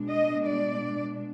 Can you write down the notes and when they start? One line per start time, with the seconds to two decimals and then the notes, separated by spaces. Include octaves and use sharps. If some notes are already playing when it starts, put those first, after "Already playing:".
Already playing: B2 G#3 D4
0.09 D#5
0.46 D5